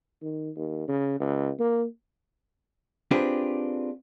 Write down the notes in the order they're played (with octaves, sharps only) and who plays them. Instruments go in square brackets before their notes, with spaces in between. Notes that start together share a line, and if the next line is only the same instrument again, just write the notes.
[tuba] D#3
D#2
C#3
C#2
A#3
[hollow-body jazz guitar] C4 D4 F4 G4 G#4 B4